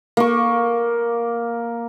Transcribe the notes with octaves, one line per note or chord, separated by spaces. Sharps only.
A#3 C#6